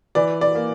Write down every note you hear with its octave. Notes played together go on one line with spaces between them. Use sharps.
E3 D5
D5
A#3